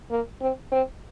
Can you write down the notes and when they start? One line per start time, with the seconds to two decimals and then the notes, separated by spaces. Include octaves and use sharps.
0.10 A#3
0.41 C4
0.72 C4